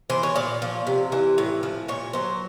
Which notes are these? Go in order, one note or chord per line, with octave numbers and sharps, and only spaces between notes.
E3 C5
C#5
A#2 D5
F3
C3
E3
A2
F3
A#2 C#5
F#3 C5